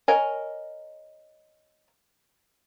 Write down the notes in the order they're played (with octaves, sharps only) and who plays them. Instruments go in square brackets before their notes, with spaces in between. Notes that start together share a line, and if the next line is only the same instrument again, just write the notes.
[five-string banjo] A#4 C#5 D#5 G#5